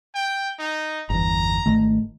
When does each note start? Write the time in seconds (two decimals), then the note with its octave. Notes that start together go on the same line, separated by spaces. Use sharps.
0.15 G5
0.59 D#4
1.10 G1 E2 A#5
1.66 G#1 D#3 A3